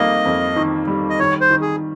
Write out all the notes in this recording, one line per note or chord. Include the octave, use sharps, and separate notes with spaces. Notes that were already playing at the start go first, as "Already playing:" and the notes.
Already playing: F2 D#3 G3 A#3 D#5
F2
D#3
G3
D#5
D#3 C#5
C5
D#3
G#4